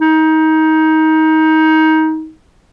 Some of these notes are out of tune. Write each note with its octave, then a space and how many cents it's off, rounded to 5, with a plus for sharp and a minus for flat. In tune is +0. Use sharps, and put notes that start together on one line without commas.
D#4 +20